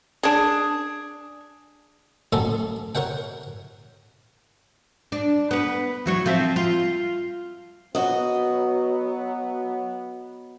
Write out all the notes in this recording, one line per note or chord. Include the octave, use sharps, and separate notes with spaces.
D4 G#4
A1 F#3 C#4 A4 A#4
A#4 C#5 F#5 G5
D4
B3 B4
E3 F#3 C#5
F3 C4 E5
F4
F#3 B3 F#4 D#5